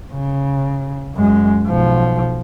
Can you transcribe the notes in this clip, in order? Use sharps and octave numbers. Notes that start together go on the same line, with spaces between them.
C#3
F#2 G#3
B1 F3